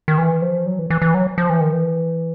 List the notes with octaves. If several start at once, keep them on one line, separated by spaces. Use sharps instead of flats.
D#3
E3
F3
F#3
E3
E3
E3
F#3
F3
E3
D#3
E3